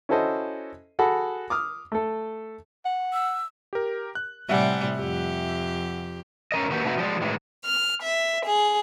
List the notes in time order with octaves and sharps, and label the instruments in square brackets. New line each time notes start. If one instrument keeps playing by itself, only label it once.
[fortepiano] C#4 E4 F#4 A4 C5 D#5
F#4 G#4 A4 F#5 B5
D6 D#6 F6
A3 A4
[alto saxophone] F#5
[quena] E6
[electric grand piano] G4 A#4
F#6
[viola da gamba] A2 C3 G3 [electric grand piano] E5 F#5 G#5
[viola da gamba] F2 G4
[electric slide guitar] C#4 A#4 D#5
D#3 A#3 D#4 F#4 G4 B4
C3 A3 D#4 F#4 B4
F3 G3 G#3
A2 D#3 E3 G#3
[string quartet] F6
E5
G#4